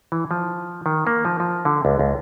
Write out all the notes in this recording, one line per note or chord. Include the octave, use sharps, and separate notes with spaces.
E3
F3
D#3
A#3
F3
F3
D3
C#2
C#2